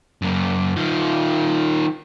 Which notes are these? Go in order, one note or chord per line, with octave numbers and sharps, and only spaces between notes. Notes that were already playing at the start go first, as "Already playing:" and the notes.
F#2 A#3
D#3 F4